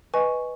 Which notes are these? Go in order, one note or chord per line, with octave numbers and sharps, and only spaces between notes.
B4 D#5 G#5 C#6